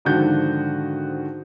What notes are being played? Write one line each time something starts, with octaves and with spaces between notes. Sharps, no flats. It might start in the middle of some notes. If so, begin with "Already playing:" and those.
G#2 D3 D#3 F3 F#4 G6